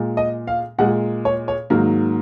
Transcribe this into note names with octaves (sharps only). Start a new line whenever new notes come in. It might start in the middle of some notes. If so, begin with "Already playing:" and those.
Already playing: A#2 G#3
D#5
F5
A#2 G#3 F#5
C#5
C#5
G#2 D#3 F#3 A#3